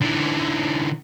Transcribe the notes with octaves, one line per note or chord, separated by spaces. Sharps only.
D3 E3